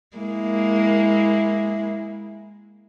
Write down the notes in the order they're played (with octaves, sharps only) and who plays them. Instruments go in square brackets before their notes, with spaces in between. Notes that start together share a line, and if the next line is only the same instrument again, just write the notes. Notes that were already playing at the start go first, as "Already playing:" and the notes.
[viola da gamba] G#3 A#3 E4